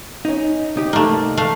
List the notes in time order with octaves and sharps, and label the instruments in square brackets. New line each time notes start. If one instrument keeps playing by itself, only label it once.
[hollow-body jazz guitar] C#4 D#4
C2 D#4 G4
[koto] A3 A#3
A3 F5